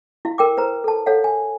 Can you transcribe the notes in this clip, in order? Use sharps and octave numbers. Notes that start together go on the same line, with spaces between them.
E4 F5
A#4 G5 D6
B4 C5 A#5
A4 A5
A4 C#5 F5 F#5
G#5